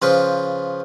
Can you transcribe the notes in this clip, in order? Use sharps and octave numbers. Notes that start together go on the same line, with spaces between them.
C#3 F3 B4 C5